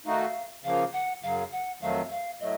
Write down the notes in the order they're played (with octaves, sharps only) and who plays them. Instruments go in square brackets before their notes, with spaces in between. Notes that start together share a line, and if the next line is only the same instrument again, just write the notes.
[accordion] D#3 A3 D#4 F#4 [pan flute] F5
[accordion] C#3 F3 A#3 [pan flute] F5
[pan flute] F#5
[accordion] F#2 C#3 F#3 [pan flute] F5
[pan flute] F#5
[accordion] F2 D#3 F#3 A3 [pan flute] F5
[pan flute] F5
[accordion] A2 F#3 A3 [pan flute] D#5